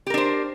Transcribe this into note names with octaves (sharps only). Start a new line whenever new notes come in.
D4 G4 A#4 C5